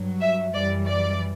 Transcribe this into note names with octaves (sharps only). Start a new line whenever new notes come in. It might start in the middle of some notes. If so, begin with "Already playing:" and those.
Already playing: G2 F#3
E5
F#2 E3 G3 D5
D5